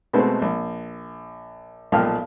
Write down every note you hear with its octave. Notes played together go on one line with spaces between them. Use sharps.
B2 G#3 A3 B3 C4
A#1
B1 A#2 F3 G5 A5 F6